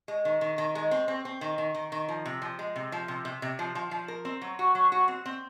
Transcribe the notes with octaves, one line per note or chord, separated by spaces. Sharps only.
G#3
D#3
D#3
D#3
G#3
C4
C4
C4
D#3
D#3
D#3
D#3
F3
C3
F3
G#3
C3
F3
C3
C3
C3
F3
F3
F3
A#4
C4
F#3
F#4
F#3
F#4
C4
C4